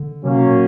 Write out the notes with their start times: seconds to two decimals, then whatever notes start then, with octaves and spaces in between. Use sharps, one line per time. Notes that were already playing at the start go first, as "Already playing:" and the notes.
Already playing: D3
0.24 C3 F#3 A#3 C#4
0.35 B2
0.47 A#2